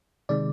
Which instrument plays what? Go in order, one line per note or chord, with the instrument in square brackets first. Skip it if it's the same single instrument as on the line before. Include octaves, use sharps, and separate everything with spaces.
[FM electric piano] C3 D#3 G#3 D5